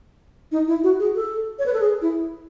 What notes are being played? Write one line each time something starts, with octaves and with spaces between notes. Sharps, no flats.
D#4
E4
F#4
G#4
A4
C#5
B4
A4
G#4
E4